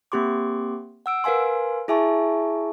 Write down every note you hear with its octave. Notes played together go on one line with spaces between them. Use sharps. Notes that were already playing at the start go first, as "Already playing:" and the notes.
A#3 C4 G4 C6 D6
F#5 E6 D7
A#4 B4 F5 G#5 C6
E4 G#4 E5 G#5 A5 C#6